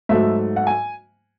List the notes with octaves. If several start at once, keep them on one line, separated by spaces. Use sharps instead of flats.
G#2 F#3 A3 E5
F#5
G#5